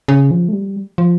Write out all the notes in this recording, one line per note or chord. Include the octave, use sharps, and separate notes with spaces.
C#3
F3
A3
G3
F3